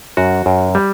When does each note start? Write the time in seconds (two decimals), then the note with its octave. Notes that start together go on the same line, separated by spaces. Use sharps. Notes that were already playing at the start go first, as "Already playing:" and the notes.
0.17 F#2 F#4
0.46 F#2
0.75 G3